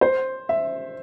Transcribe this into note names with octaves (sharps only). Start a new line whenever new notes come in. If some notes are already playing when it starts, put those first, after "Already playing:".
C5
E5